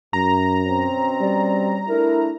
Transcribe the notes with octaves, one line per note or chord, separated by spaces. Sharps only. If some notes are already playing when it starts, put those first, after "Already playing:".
F#2 A#5
B2 C4 C#4
G3 D5
A3 D4 E4 A#4